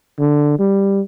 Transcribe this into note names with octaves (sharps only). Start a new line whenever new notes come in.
D3
G3